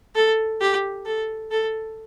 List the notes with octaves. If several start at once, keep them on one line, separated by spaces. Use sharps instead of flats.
A4
G4
A4
A4